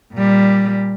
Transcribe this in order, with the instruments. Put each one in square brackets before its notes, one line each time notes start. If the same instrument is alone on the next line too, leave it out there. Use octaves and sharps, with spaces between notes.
[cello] A#2 G3